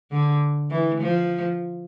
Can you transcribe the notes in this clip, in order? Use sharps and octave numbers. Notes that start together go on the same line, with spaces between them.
D3
E3
F3